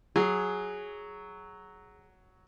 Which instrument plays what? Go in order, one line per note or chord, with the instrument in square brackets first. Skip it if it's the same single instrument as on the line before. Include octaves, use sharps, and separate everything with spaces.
[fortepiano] F#3 [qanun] G#4